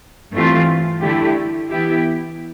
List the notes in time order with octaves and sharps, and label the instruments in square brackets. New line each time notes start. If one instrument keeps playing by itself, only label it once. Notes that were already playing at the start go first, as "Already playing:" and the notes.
[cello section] G2 E3 A3 C4 F4
D3 A3 E4 G4
E3 B3 E4 G4